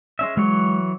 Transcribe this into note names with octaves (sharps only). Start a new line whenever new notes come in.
G#3 C#4 E5
E3 F#3 G#3 C#5